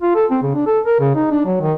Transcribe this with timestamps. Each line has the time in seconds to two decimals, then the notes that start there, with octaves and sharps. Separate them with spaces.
0.02 F4
0.15 A4
0.30 C4
0.42 C#3
0.55 D4
0.66 A4
0.86 A#4
1.00 C#3
1.15 D#4
1.31 D4
1.46 F#3
1.61 D#3